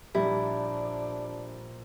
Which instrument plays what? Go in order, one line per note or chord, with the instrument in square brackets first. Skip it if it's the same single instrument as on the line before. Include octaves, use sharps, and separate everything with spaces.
[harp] A#1 [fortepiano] G3 [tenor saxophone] D4 [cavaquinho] E4